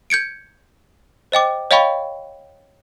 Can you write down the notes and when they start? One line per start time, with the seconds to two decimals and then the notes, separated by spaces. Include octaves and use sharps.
0.10 G6 G#6 C#7 D7
1.32 C5 D#5 G5 D6
1.71 C#5 D#5 F5 G5 B5 C#6